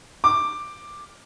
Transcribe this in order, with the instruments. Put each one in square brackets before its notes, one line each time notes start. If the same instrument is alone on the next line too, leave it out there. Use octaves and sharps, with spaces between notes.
[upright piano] D6